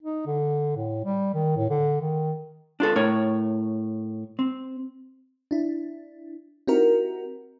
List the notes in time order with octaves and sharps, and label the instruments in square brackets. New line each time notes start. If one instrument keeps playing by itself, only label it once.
[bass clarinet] D#4
D3
A2
G3
D#3
A2
D3
D#3
[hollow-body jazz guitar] D4 F4 A4
A2 A#4 C#5
C4
[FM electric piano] D4 E4
C4 D#4 E4 F#4 G4 A#4